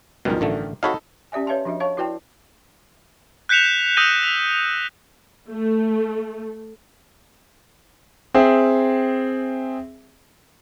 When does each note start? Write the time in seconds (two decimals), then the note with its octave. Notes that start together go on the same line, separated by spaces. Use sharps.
0.25 C#2 G2 B2 D#3 F3
0.41 A1 D3 A3
0.83 D#4 F#4 A4 C#5 F5 B5
1.32 C#4 G4 D5 E5 G#5
1.46 B4 C#5 E5 F5 A5 C6
1.65 F3 D4 F#4 D#5 E5
1.80 C#5 F5 A5 C#6
1.97 E4 F#4 B4 D5 G5 A5
3.49 F#6 G6 B6 C#7 E7 F7
3.97 D#6 E6 G6 A#6 D#7 G7
4.23 B6
5.50 A3
8.34 C4 G#4 E5